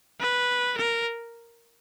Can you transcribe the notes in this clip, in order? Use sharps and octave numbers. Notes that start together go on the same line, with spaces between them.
B4
A#4